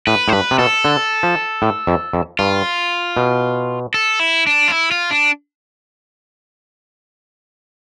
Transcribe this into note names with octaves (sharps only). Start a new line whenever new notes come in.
A2 B4
A2 C5
G2 B4
C3
B2 A4
D3
F3
A2
F2
F2
G2 F4
B2
A4
E4
D4
F4
E4
F4
D4